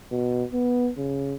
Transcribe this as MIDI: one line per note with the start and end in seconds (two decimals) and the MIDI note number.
0.11 0.44 47
0.53 0.90 59
0.98 1.34 49